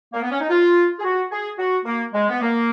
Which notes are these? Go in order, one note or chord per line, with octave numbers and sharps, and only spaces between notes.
A#3
B3
C#4
D#4
F4
G#4
F#4
G#4
F#4
A#3
G#3
B3
A#3